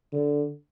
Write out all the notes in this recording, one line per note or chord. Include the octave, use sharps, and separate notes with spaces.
D3